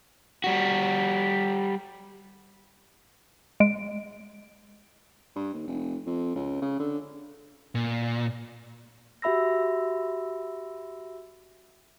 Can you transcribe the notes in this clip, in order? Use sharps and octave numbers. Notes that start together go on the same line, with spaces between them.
G3 F#4
G#3 D7
G2
D#2
F1
F2
C#2
C#3
D3
A#2
F#4 G4 E5 B5 E6 A#6